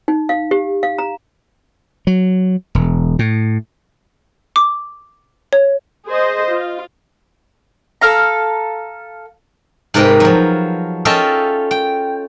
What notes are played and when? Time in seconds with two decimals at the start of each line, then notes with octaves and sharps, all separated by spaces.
0.08 D#4
0.29 F5
0.51 G4
0.83 F5
0.98 A#5
2.07 F#3
2.75 E1
3.19 A2
4.56 D6
5.53 C#5
6.08 G#4 C5 D#5
6.50 F4
8.01 A4 F5 A#5
9.94 G#2 C3 A#4 B4 D#5 G5
10.20 F3 F#3
11.05 C#4 F4 A4 D#5 E5 G5
11.71 G5